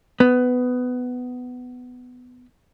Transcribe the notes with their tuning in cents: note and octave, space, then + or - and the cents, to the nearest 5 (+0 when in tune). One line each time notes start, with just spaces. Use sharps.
B3 +15